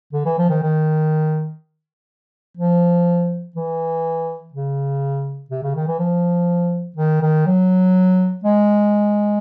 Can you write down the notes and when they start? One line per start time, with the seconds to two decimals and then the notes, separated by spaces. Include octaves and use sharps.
0.13 D3
0.25 E3
0.38 F3
0.49 D#3
0.62 D#3
2.57 F3
3.56 E3
4.53 C#3
5.50 C3
5.63 C#3
5.75 D#3
5.88 E3
5.99 F3
6.96 D#3
7.22 D#3
7.46 F#3
8.44 G#3